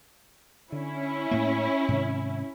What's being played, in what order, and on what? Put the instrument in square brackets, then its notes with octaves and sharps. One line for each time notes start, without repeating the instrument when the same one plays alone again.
[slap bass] D3 [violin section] C#4 E4
[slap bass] A2 A#3
G#2 C3 D#3